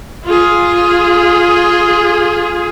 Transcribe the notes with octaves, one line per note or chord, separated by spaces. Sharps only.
F4 G#4